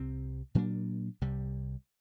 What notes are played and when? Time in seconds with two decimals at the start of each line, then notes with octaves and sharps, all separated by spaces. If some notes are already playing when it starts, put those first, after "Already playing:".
Already playing: C2 C3 C4
0.55 A#2 F#3 A#3 D4
1.21 C2 C3 G3